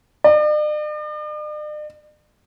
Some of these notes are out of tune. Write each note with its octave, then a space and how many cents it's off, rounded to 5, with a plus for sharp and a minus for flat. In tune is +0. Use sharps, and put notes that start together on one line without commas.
D5 +45